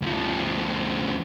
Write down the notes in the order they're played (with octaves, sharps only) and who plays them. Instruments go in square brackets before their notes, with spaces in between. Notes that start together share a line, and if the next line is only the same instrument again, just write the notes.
[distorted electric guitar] D2 F3